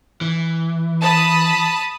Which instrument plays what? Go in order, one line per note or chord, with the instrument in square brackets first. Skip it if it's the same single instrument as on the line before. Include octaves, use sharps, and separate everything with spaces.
[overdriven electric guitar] E3
[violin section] A5 B5 D#6